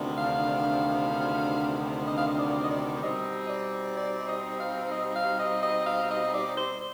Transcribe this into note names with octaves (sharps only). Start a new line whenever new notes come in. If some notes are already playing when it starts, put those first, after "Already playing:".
Already playing: D2 C3 D#3 B3 D4
F5
D#5
F5
D#5
D5
D#5
D5
B2 G3 C4 D#4 D#5
D#5
D5
D5
D#5
F5
D#5
F5
D#5
D#5
F5
D#5
D5
C5